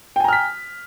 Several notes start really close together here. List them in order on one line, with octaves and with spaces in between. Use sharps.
G5 G#5 A#5 F6 B6